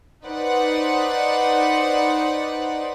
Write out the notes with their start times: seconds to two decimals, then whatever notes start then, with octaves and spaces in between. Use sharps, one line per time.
0.26 D#4 B4 C5 D5 F#5